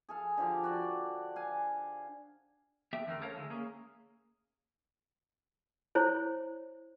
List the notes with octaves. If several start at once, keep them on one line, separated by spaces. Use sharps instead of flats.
G#4 A4 F5
D3 F3 G4 F5
F#4 D5
F5 G#5
B3 G4 E5 G5
E2 D3 A3 C4 A#4
C#4 A4 A#4 C5 C#5 F5
D3 G#3 E4
A#3 C#4 G#4
E4 C5 C#5